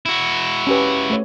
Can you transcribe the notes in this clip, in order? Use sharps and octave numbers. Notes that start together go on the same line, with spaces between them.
E4 F#4
C#4 G4 B4
A3 C#5